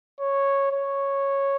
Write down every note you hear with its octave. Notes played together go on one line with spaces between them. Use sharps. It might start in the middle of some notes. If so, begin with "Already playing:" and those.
C#5
C#5